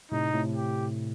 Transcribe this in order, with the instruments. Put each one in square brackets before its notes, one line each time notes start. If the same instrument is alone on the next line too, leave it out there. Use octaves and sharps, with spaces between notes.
[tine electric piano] A2 C3 [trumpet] D#4
[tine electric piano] A2 C3
[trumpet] G4